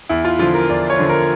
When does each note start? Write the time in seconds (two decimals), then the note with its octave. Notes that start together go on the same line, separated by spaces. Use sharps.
0.09 E2 E4
0.25 F4
0.39 D3 F3 F4
0.54 A#4
0.70 E2 D5
0.90 C#5
0.99 D3 F3
1.09 A#4